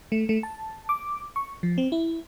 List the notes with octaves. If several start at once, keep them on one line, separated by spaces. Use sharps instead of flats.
A3
A3
A5
D6
C#6
F3
C4
E4